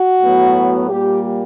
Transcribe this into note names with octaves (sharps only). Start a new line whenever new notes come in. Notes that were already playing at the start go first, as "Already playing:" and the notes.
Already playing: F#4
A2 F#3 B3
A#2 G3 A#3 G4